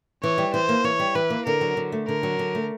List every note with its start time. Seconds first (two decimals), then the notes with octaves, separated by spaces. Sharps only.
0.23 E3 C#5
0.38 G3
0.54 E3 C5
0.69 A#3
0.84 E3 C#5
1.00 G3
1.15 E3 B4
1.30 A#3
1.46 D3 A#4
1.61 F#3
1.77 D3
1.92 A3
2.07 D3 A#4
2.23 F#3
2.39 D3
2.55 A3